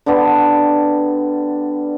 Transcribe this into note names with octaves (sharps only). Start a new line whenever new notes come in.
D3 G3 B3 D4